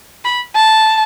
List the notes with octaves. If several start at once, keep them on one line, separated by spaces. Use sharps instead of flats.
B5
A5